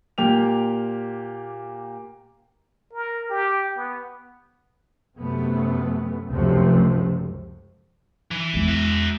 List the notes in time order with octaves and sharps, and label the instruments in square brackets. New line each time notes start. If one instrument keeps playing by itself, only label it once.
[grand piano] A#2 A#3 G4 G5 F7
[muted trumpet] A#4
G4
B3
[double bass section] F#2 C3 A3 B3
F1 C#2 F#2 C3 F3 A3
[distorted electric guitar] E3
[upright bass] E2 G#3
[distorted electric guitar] F#4 E5